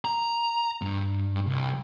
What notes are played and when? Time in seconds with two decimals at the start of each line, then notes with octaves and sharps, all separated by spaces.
0.05 A#5
0.82 G2
1.47 C2